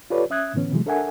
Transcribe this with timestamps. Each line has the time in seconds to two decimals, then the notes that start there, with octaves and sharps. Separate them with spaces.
0.10 F4 G4 A4 B4 C#5 D5
0.30 C#4 E5 D#6 F#6 G#6
0.54 A2 D3 E3 B3 C#4
0.72 C3 D#3 E3 F#3 G#3 A3
0.86 D4 A4 A#4 E5 F#5 G#5